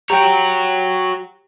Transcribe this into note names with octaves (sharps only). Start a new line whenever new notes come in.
F#4 G4 C#5 G5 A#5